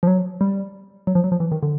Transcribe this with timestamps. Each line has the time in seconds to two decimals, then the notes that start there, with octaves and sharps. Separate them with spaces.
0.03 F3
0.07 F#3
0.41 G3
1.07 F#3
1.15 F3
1.24 F#3
1.32 F3
1.40 E3
1.52 D#3
1.63 D3